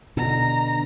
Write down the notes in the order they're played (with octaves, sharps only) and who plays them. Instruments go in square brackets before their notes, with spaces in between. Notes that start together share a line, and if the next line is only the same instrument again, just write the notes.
[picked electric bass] B2 D3 [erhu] A#5